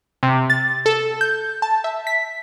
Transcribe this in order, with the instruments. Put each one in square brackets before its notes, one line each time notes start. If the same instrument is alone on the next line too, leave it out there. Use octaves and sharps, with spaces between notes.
[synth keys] C3
A6
A4
G6
A5
E5
B6